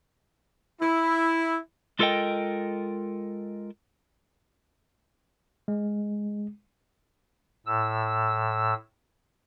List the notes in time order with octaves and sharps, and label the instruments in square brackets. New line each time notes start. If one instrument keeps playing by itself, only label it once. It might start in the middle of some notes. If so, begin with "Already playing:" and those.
[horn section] E4
[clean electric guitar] G#3 F4 A4 A#4 D#5 G5
[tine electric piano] G#3
[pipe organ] A2 E6